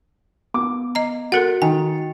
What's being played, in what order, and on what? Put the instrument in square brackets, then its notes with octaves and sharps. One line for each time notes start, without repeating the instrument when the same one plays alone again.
[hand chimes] B3 [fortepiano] D6
[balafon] D#5 A#5
[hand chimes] F#4 A6 C#7 [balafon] A4 A#4 F#5
[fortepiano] D#3 [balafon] G#5